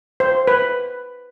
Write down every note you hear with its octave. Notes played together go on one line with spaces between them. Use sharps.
C5
B4